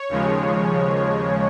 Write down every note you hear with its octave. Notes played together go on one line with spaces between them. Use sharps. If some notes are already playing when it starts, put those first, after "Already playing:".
Already playing: C#5
D#2 C#3 F3 G#3